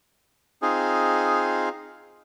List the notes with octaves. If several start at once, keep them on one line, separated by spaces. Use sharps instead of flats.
C4 D#4 F4 G#4